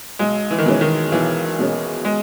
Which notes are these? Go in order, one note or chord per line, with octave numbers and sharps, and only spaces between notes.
B1 G#3
E3
D#3
B2 E3 G#3 C#4
D#3
B1 E3
B2 G#3 C#4
G#3